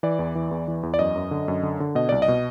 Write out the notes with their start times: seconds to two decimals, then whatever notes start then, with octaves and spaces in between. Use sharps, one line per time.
0.03 E3 D5
0.19 E2
0.35 E3
0.51 E2
0.68 E3
0.83 E2
0.94 D5
0.99 F#2 D#5
1.16 F#2
1.31 D3
1.48 F#2
1.63 D3
1.80 D3
1.95 B2 D#5
2.09 C2 D5
2.22 D#5
2.28 B2